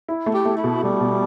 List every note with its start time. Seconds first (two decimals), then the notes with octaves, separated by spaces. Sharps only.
0.08 E4
0.26 A3
0.33 G4
0.45 A3
0.57 E4
0.64 B2
0.83 B2 G3
1.01 B2